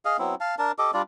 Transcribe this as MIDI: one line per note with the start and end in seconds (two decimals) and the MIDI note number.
0.05 0.17 68
0.05 0.17 75
0.05 0.17 77
0.19 0.35 54
0.19 0.35 59
0.19 0.35 60
0.19 0.35 64
0.41 0.55 77
0.41 0.55 81
0.59 0.72 62
0.59 0.72 70
0.59 0.72 81
0.79 0.91 67
0.79 0.91 69
0.79 0.91 75
0.79 0.91 86
0.94 1.02 55
0.94 1.02 62
0.94 1.02 65
0.94 1.02 74